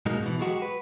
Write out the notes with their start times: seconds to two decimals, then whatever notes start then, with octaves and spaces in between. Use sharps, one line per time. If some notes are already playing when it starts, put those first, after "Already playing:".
0.06 G#2 B2 F#3 G#3 A#3 D#4
0.23 B2 E3
0.39 F#3 G#3 F#4 G4
0.62 B4